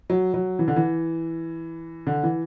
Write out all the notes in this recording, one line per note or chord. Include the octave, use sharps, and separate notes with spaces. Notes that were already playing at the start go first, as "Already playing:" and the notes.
F#3
F#3
E3
D3
E3
D3
E3